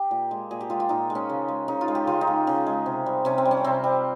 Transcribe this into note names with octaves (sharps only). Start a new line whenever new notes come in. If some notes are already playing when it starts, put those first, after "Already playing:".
Already playing: G4
A#2
G#3
A#2 G#4
G4
G#3 F4
F4
A#2 D#4
G#3
C#4
C#3
G#3
C#3 D#4
F4
G#3
G4
C#3 F4
D#4
G#3
C#3
G#3
C3
G3
C3 C#4
C4
G3
C#4
C3 C4
G3